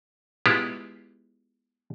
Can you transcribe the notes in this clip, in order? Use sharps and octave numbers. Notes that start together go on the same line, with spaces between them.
G#3 B3 E4 F4 G4